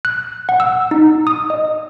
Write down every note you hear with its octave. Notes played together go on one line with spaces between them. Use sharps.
F#6
F#5
E6
D#4
D#6
D#5